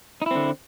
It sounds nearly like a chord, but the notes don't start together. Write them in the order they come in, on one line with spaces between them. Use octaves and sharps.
D#4 E4 C4 D3